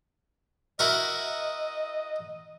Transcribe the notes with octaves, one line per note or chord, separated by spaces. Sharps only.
E4 F#4 A#4 D#5